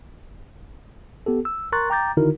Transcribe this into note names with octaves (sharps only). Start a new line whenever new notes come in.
B3 G4 A4
E6
A#4 A#5 C6 C#6 F#6 A6
G5 A#5 D6 G6 A6
D3 D#3 D#4 E4 F#4 A#4